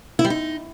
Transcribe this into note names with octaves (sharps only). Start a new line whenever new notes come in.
E4
G3
D#4